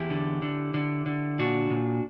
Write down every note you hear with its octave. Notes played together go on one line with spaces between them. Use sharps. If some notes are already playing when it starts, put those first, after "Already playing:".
Already playing: E2 E4 G4
D3
D3
D3
D3
A#2 D4 F#4
A#2